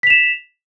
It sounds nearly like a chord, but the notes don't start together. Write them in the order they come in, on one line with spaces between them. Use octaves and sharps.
B6 F7 E7